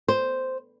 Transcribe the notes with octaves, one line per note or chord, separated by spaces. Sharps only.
C5